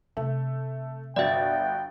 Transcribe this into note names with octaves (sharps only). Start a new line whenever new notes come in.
C3 A3
G1 F#4 D5 E5 G5 A6